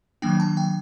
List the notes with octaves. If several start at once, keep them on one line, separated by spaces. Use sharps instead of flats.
D#3 F#3 A#3 D4 G5
A5
G5